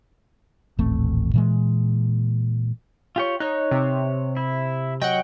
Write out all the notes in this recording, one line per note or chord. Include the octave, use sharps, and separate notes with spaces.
D#1 A1 A3 C4
A#2 E3 G#3
F4 G4 C#5
D#4 C#5 F#6
C3
E4
F#3 D#5 F#5 G5